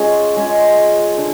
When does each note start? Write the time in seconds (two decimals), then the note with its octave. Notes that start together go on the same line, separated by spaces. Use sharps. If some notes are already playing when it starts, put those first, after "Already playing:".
Already playing: G#3 C#4 F4 G#4
0.36 G#3 C#4 F4 G#4
1.17 D3